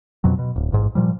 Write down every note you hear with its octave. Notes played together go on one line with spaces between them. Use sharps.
F2 B2 F#3
B2
D1
A1 G#2
A#2 F3 G3